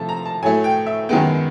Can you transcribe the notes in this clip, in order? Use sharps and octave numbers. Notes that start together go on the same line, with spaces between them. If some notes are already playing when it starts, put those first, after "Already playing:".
Already playing: C3 F3 A3 A5
A#5
A5
A2 F#3 A3 G#5
G5
E5
F#2 D#3 G#3 B3 G5